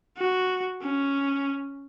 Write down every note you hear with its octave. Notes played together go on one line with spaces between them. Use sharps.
F#4
C#4